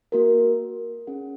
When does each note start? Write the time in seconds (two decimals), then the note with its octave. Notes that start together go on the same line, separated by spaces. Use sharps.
0.12 A#3 F#4 A#4
1.07 C#4 G#4 F#5